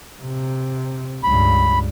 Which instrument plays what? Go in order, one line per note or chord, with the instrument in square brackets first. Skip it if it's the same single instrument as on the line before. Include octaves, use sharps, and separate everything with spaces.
[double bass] C3
[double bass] C#2 G2 [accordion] B5